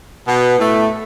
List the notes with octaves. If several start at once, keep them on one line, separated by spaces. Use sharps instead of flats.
B2 B3
A2 A3